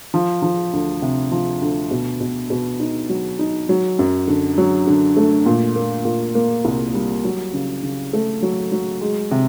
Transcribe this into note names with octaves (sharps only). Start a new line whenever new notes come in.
F3
F3
D2
C3
F3
D2
B2
B2
B2
D#4
F#3
D#4
F#3
F#2
D3
F#3
D3
A3
A#2
A#3
A#2
A#3
C2
G3
F#3
C#3
C#3
A3
F#3
F#3
G#3
C3